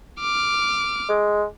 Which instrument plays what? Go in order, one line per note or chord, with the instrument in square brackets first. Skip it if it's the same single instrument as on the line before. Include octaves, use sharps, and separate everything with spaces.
[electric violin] D6 F6
[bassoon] G#3